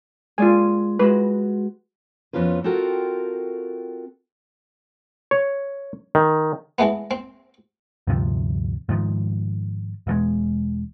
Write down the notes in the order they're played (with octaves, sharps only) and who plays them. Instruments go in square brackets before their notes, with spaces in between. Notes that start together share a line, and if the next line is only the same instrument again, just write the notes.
[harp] G#3 [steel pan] F4 D5 G#5
[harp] G#3 F#4 [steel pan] B4
[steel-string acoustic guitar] F2 B3 C#4 F4 B4
C4 F4 F#4 A4 A#4 G5
[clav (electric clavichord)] C#5
D#3
[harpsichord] E3 G#3 A3 B3
C4
[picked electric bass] D2 G2 C3 F3
G#2 D#3 F3
E1 E2 G#3